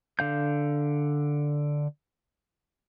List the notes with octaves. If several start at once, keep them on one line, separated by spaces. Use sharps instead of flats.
D3 F5 G6